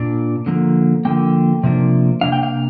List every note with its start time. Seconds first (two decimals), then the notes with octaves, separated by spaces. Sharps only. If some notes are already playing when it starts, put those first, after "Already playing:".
Already playing: A#2 A#3 D4
0.46 D3 F3 A#3
1.05 D3 F3 A#3 G5
1.63 C3 F3 A#3 D4
2.21 C3 F3 A#3 D4 F5
2.32 G5
2.43 F5